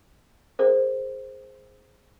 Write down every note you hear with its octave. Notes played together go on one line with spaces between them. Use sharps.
G#4 A#4 C5